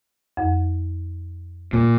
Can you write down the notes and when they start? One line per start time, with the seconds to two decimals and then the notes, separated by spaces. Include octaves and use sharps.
0.37 F2
1.73 A#2